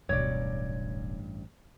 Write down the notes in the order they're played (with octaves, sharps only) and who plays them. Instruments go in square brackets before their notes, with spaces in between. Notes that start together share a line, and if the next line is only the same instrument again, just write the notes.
[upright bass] D1 B2 [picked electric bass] A1 G2 [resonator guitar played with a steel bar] C#5 D5